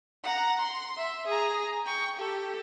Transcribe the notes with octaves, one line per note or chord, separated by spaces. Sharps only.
F#5 A#5
C6
E5
G#4 A#5
G5 C#6
G4 A4